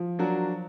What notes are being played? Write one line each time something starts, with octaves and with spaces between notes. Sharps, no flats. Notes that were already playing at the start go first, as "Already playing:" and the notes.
Already playing: F3
F#3 D4 F#4 A#4